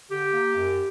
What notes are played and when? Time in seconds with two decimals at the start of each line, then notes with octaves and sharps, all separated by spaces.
0.09 D3 G4
0.33 A#3
0.55 F#2